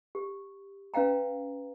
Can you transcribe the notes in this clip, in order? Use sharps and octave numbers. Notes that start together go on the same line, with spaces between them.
G4
C#4 B4 F5 G5 A#5